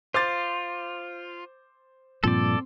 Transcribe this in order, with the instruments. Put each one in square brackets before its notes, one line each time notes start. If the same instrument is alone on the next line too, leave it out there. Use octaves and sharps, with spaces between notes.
[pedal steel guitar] F4 [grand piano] C5 D6 A6
[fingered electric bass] G2 A#2 F3 [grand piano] C4 [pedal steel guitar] A4 D5